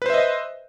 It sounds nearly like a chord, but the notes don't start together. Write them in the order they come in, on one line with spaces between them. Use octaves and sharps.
B4 C5 E5 D#5